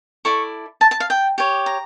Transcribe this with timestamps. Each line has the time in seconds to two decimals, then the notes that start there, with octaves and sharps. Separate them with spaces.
0.25 E4 A4 D5 C#6
0.81 A5
0.91 A5
1.00 F5
1.10 G5
1.38 G4 C#5
1.66 A#5